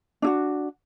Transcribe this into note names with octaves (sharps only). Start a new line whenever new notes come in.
D4 E4 F#4